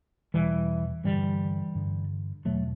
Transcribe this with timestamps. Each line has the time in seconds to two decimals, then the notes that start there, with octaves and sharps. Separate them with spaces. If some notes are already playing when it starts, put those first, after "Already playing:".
0.34 E2 B2 E3 G3
1.04 G2 D3 E3 G3
1.75 G2 D3
2.45 E2 B2 F#3 A3